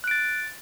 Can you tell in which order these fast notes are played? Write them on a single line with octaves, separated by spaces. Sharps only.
F#6 D7 A6